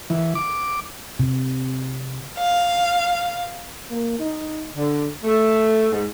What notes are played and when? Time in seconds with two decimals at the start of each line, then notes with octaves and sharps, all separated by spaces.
0.10 E3
0.35 D6
1.20 C3
2.38 F5
3.90 A#3
4.19 D#4
4.76 D3
5.24 A3
5.92 G#2